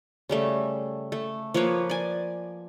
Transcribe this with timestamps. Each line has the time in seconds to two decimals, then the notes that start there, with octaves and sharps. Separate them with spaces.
0.29 C#3 G3 A3
1.12 A3
1.54 F3 A#3 B4 C#5
1.90 D5 G#5